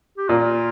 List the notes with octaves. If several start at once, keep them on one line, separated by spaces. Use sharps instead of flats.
G4
A#2 F4